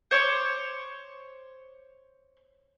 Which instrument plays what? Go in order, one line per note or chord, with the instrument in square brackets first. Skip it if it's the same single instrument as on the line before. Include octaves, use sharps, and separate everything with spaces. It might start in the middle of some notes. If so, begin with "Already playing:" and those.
[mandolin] C5 C#5 C6 D6